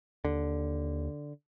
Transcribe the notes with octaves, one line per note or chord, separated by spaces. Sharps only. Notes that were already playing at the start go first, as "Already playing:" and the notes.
D#2 D3